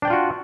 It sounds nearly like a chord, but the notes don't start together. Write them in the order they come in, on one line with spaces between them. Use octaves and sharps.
D4 G5 D5 F4 F#4